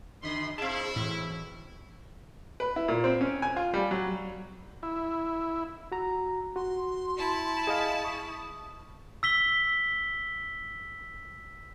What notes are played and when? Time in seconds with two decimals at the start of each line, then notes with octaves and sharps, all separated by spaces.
0.22 F#2 D3 D#5 B5 C6
0.58 B2 C4 E4 G#4 F5 A5
0.96 A2 E3
2.60 B4
2.76 E4
2.88 A#2
3.04 C4
3.21 C#4
3.42 G#5
3.56 F4
3.74 G3
3.91 F#3
4.83 E4
5.92 F#4 A#5
6.56 F#4 C6
7.18 E4 A5
7.67 G#4 D#5 F5
8.05 C#6 D#6
9.23 E6 B6 G7